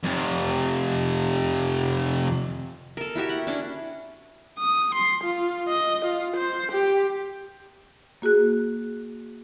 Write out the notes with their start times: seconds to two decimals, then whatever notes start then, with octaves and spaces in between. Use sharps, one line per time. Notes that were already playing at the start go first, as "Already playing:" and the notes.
0.04 F2 C3
2.97 A4 A#4
3.15 E4 F#4 G4 E5
3.29 F#5
3.47 C#4 D4
4.59 D#6
4.95 C6
5.24 F4
5.68 D#5
6.05 F4
6.37 C5
6.72 G4
8.22 A#3 F#4 G#4 F#6